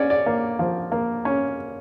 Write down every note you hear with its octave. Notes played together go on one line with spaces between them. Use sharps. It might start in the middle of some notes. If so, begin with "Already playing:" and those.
Already playing: C#4 C#5 D5
D5
A#3
F3
A#3
C#4